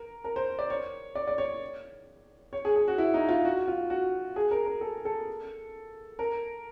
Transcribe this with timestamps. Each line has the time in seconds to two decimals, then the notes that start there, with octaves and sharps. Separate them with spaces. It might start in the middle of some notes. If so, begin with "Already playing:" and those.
Already playing: A#4
0.24 A#4
0.36 C5
0.59 D5
0.70 C#5
1.15 D5
1.27 D5
1.38 C#5
2.53 C#5
2.65 G#4
2.76 G#4
2.88 F#4
2.98 E4
3.14 D#4
3.29 F4
3.45 F#4
3.68 F4
3.90 F#4
4.36 G#4
4.51 A#4
4.66 A#4
4.81 A4
5.05 A4
6.19 A#4